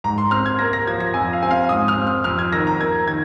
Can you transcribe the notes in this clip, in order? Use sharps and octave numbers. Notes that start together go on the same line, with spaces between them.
G#2 A#5
C6
C4 F6
G#6
A#3 A#6
A#6
F3 G#6
A#6
F2 G#5
F5
C4 G#5
F5
G#2 D#6
F6
C4
F6
F2 F6
G#6
D#3 A#6
A#5
A#3 G#6
D#3 G#6